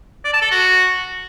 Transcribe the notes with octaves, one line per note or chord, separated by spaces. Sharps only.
D5
A5
A4
F#4